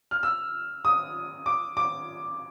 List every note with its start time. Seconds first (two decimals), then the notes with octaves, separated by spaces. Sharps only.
0.11 F6
0.23 E6
0.85 D#6
1.46 D6
1.77 D6